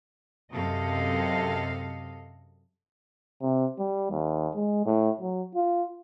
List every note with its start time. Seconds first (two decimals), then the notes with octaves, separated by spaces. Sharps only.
0.53 F#2 C3 A4 D#5 F5
3.42 C3
3.79 G3
4.11 D#2
4.55 G#3
4.86 A2
5.21 F#3
5.55 F4